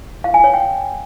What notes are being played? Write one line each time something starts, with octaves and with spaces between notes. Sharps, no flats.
F5
G#5
C#5
G5